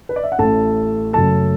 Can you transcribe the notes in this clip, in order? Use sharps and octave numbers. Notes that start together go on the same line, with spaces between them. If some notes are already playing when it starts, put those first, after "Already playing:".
B4
D5
E5
F#5
A1 A2 A3 A4 A5
F#1 F#2 F#3 A3 A4 A5